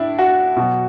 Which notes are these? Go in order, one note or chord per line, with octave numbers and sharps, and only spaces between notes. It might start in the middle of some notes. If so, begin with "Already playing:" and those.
Already playing: A2 D4 E4
F#4
B2 F#3